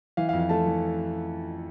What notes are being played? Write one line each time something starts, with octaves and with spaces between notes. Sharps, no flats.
E3 F5
F5
F2
F5
A3 A5
E3